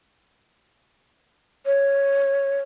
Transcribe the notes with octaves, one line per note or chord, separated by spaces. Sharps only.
C#5